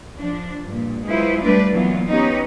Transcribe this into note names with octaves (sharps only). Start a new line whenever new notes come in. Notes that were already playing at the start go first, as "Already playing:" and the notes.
F3 D4
G2 A#2
F#3 G#3 E4 F4 B4 C5
G3 A3 D4 B4 D5
E3 F#3 A#3 B3 F4
B3 C#4 D#4 G4 B4 C#5